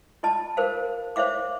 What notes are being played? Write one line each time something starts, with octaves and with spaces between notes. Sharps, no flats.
F4 D#5 A5
A#4 C5 F5
C5 C#5 E5 F5 D6